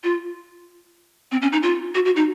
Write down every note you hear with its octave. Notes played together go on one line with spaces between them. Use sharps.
F4
C4
C#4
D#4
F4
F#4
F#4
D#4